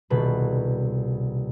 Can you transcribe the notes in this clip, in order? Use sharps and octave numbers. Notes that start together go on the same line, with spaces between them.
D#1 C2 B2 B4